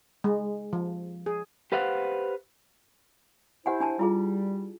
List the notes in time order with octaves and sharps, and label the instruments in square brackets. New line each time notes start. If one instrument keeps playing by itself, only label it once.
[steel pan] G#3
F3
G#4
[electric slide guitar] G4 B4 C5 F5 F#5
[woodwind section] E4 C5 [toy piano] G4 F#5 G#5
[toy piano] D4 G#5 A5
[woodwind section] G3 [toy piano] E4 F4 G#4